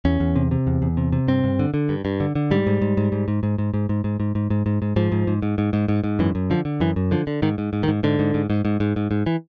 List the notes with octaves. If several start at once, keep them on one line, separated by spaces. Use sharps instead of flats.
E2 C#4
E2
C3
C3
E2
E2
C3
C3
G2 C4
G2
D3
D3
G2
G2
D3
D3
G#2 G3
G#2
G#2
G#2
G#2
G#2
G#2
G#2
G#2
G#2
G#2
G#2
G#2
G#2
G#2
G#2
G#2 F3
G#2
G#2
G#2
G#2
G#2
G#2
G#2
F#2 E3
F#2
D3 F3
D3
F#2 E3
F#2
D3 F3
D3
G#2 D#3
G#2
G#2
D#3
G#2
G#2 D3
G#2
G#2
G#2
G#2
G#2
G#2
G#2
E3